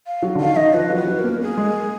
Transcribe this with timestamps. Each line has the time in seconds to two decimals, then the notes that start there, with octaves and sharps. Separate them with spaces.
0.07 F5
0.23 F#3
0.35 D3
0.39 D#3 F5
0.56 D#3 D#5
0.74 F3 B4
0.90 F#3
0.96 B4
1.07 F#3
1.19 A#4
1.24 A#3
1.41 A#3 G#4
1.57 G#3